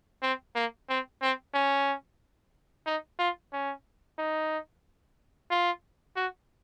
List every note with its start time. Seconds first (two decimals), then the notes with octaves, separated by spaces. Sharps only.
0.23 C4
0.55 A#3
0.89 C4
1.22 C4
1.54 C#4
2.86 D#4
3.19 F4
3.53 C#4
4.19 D#4
5.51 F4
6.16 F#4